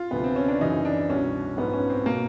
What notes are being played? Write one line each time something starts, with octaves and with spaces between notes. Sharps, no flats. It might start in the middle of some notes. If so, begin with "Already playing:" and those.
Already playing: F4
D2 C3 F3 B3
C4
C#4
D4
F#2 C#3 E3 D#4
D4
C2 B2 C#4
G#2 F3 B3
C#4
C4
B2 A#3